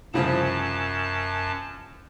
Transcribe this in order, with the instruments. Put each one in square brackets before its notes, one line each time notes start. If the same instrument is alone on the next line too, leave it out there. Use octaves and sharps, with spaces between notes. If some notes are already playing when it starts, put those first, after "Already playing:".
[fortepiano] C2 C#3 F3 [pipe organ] F#2 A5